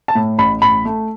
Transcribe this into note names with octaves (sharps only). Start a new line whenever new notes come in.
A5
A2
A1 B5
A1 B5
A3